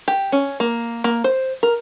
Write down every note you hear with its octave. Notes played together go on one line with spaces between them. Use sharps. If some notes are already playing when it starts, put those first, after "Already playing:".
G4
C#4
A#3
A#3
C5
A#4